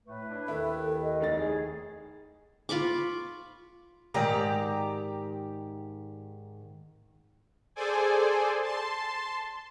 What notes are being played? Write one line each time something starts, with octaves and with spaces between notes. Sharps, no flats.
A2 A3 B4
D4 E4
D#2 D#3 E4 A4
D#5
F1 D#4 A6
G#4
F4 B5 C#6 D6
G#2 D#3 G4 D5 A#5
G#4 A4 C5 D5 G#5
A5 C6